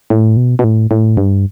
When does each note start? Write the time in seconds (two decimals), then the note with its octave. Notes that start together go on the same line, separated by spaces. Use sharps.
0.10 A2
0.37 B2
0.59 B2
0.64 A2
0.91 A2
1.17 G2